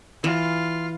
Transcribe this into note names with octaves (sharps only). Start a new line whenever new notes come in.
E3 F4